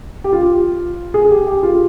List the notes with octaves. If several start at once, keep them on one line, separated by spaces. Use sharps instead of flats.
G4
F4
G#4
G4
G4
F4